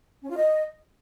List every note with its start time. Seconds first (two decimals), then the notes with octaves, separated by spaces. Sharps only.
0.23 C#4
0.30 F4
0.36 D#5